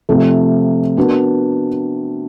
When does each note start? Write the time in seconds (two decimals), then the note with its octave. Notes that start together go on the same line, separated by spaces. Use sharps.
0.09 C3 F3 A3
0.97 B3 D4 F#4 A#4